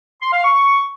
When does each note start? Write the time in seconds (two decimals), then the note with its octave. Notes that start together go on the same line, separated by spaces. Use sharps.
0.22 C6
0.33 F5
0.44 C#6